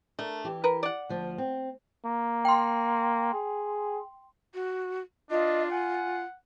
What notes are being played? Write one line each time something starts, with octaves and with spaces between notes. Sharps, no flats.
A3 D4 A#4
E3 G4
A#4 B4
D5 F#5
D2 F3
C4
A#3
G5 C6
G#4
F#4
D4 F4 D#5
F#5 G#5